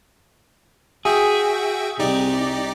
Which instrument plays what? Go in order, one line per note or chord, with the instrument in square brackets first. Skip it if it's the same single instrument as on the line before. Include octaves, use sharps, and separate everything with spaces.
[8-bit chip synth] F#4 E5 G5 [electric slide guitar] G#4
[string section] C2 [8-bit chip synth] D#4 G4 D5